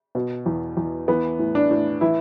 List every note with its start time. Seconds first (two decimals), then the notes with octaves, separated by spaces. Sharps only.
0.15 B2
0.46 E2
0.77 E2
1.08 E3 B3
1.39 A2
1.55 D4
1.71 A2
2.01 E3 E4